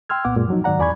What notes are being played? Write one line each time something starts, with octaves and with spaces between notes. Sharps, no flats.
G5 C6 E6 F6 G#6
C2 A#2 B3 F#5 D6
F#2 A#2 G#3
F3 F#3 D#4
G#2 D#3 F#3 D5 F#5 A#5
E2 D5 G#5 B5 C#6 G#6